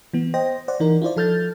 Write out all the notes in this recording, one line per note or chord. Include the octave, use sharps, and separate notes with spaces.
E3 B3
C5 D#5 G5 A#6
C5 D5 F#5
E3 D#4 A#4
E4 F4 C5 D5
F3 A4 F6 G6 A6